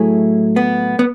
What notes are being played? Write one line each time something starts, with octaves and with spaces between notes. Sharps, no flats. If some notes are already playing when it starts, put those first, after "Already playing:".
Already playing: A2 F#3 A3 E4 G#4
B3
B3